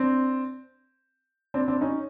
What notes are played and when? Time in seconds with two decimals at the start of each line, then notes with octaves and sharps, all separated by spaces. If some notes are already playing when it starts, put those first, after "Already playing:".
Already playing: C4 D4
1.54 C4 D4
1.68 C4 D4
1.81 C#4 D#4